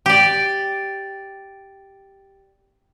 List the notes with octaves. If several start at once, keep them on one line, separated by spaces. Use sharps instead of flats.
G4 D5